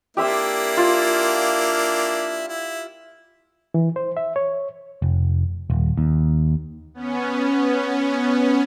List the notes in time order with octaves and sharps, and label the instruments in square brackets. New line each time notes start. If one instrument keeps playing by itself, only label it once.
[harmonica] A#3 D4 E4 [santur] G4 E5 C6
[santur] F4
[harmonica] E4
[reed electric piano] E3
C5
E5
C#5
[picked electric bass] F1
D#1
D#2
[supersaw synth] B3 C#4